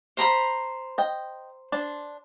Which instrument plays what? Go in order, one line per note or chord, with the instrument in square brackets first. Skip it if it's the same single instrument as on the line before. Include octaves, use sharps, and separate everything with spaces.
[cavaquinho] C5 A#5 B5
[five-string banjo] D#5 G5
D4 C5 D5